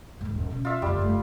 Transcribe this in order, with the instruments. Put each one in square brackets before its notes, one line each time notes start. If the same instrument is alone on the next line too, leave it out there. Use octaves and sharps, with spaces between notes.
[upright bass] D#2 G#2
D#1
B2 C#4
[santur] F4 E5
[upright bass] F1 D2 [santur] G3
[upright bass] F#1 A3